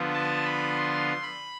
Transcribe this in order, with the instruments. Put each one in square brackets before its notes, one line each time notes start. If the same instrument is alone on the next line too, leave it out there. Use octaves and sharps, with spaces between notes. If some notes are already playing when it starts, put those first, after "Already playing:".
Already playing: [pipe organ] D3 F3 B3 F4
A5
B5
C6
B5